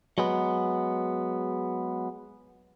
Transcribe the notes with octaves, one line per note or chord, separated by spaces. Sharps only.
F#3 G#3 B3